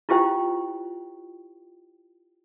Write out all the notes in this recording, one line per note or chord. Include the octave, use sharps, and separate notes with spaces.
E4 F4 G4 C5 G5